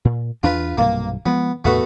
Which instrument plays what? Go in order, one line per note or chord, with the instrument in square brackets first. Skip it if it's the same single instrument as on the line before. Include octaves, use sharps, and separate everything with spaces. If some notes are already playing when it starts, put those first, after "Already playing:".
[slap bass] A#2
[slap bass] E2 D4 [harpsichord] F4 B4
[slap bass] B1 G2 C3 [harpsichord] A#3
[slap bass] F3 G#3 [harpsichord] B3
[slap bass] E2 A2 C3 [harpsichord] A3 B3 F#4